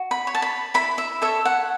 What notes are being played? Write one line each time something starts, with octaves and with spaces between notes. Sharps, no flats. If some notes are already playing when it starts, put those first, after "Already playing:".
Already playing: F#4
B5
C#5
A5
B5
E4 B5
E5
A4 C#5 E5
F#5